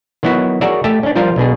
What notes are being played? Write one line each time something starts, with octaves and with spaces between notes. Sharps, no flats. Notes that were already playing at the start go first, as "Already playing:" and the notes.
D#3 F#3 B3 E4 F#4
F#4 G#4 A#4 C#5 D5 E5
A3 G4 E5 A5
C#4 D4
F3 G3 F4 A#4 C5 F5
B1 B2 D4 G#4